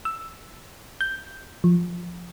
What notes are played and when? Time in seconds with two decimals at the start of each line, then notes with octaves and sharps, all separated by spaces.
0.05 E6
1.01 G6
1.64 F3